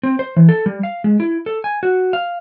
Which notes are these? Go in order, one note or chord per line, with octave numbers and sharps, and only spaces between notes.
C4
C5
E3
A4
G3
F5
G#3
E4
A4
G#5
F#4
F5